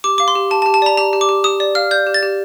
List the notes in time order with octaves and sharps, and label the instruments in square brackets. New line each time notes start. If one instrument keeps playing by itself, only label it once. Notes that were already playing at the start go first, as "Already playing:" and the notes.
[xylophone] G4 D6
F5 D6
C6
G4
G4 A5
A5
G4
A5
D5 A#5
G4 A#5
G4
D6
G4
G4 D#6
D5
F5 F6
D5 G6
G4
A6
G4